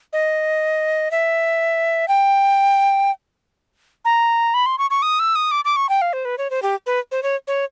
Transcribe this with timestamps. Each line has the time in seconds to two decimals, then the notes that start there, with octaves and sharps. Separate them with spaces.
0.13 D#5
1.11 E5
2.08 G5
4.05 A#5
4.54 B5
4.66 C6
4.78 C#6
4.90 C#6
5.02 D#6
5.19 E6
5.35 D#6
5.51 D6
5.65 D6
5.76 C#6
5.89 G5
6.01 F5
6.13 C5
6.25 B4
6.38 C#5
6.50 C5
6.62 G4
6.86 B4
7.11 C5
7.23 C#5
7.47 C#5